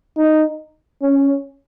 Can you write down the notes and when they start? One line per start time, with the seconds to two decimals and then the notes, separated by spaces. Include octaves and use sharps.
0.17 D#4
1.02 C#4